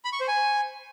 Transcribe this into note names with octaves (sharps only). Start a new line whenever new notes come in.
B5
C#6
C5
G#5